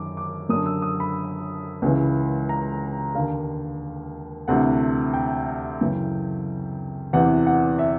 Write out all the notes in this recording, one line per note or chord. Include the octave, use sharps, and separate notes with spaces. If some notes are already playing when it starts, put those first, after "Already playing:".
Already playing: F#2 D#3 D6
D6
F#2 D3 D#6
E6
D#6
B5
C#2 C#3 E3
A#5
D#2 D3 F5
D2 C3 E3 F#5
G5
F#2 C#3 E3
E2 C3 E3 F#5
F#5
E5